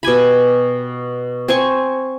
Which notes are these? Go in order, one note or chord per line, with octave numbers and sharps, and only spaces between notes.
B2 G4 G#5 B5
C4 C5 G#5 C#6